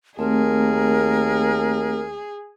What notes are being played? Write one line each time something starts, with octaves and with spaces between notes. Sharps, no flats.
D#2 A3 C4 G#4 A#4